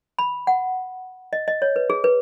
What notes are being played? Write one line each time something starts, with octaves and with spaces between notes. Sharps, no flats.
B5
F#5
D#5
D#5
C#5
B4
G#4
B4